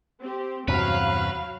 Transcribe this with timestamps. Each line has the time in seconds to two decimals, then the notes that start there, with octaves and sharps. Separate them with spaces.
0.21 C4 G4
0.68 E2 G2 C3 F#3 F#4 B4 F5